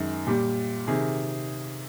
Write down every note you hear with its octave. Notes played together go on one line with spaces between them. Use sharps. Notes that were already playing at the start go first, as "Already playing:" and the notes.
Already playing: F#2 D#3 G#3
A#2 G3 G4
C3 D#3 G#4